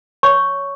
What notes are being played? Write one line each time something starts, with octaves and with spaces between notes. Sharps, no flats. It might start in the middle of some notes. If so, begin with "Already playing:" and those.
C#5 C#6